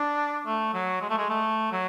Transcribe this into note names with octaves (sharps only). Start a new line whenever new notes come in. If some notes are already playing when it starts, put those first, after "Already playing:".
Already playing: D4
A3
F#3
G#3
A3
G#3
A3
F#3